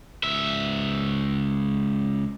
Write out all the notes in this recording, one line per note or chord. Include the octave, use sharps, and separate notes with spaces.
C#2 E5